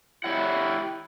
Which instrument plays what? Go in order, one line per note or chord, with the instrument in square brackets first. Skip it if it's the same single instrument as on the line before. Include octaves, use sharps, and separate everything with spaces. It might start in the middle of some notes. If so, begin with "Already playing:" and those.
[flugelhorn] E4 [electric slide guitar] G4 C#5 F#5